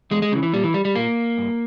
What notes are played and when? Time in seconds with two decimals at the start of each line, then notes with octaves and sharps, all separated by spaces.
0.11 E2 G#3
0.22 G#3
0.32 C#3 E3 G3
0.43 E3
0.53 A#2 G3
0.64 E3
0.74 G3
0.85 G3
0.96 A#2 A#3
1.38 G2